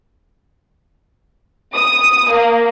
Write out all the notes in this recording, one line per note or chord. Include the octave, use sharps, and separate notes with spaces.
D#6
A#3